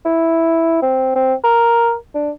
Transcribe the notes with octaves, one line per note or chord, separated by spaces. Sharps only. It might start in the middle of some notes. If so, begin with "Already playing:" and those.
E4
C4
C4
A#4
D4